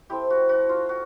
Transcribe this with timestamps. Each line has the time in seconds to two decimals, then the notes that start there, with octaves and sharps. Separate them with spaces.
0.10 A3 C4 E4 G4
0.30 F#4
0.49 F#4
0.69 F4
0.89 F#4